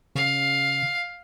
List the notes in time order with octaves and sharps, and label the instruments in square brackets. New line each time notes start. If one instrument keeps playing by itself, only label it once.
[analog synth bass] C#3 [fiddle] F5